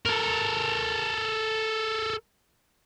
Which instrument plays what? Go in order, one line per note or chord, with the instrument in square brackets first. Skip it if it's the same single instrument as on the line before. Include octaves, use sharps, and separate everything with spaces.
[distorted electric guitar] A4 A#4